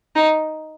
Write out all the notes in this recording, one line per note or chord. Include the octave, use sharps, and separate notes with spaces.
D#4